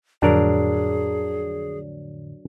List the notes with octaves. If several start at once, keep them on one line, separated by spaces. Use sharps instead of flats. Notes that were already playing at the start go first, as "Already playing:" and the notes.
F2 A2 D3 F#3 D4 G#4 A#4